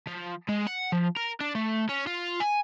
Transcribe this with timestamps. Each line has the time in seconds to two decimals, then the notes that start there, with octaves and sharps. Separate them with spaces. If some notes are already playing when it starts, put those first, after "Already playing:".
0.07 F3
0.49 G#3
0.67 F#5
0.92 F3
1.17 A#4
1.41 D4
1.55 A3
1.89 C#4
2.07 F4
2.40 G#5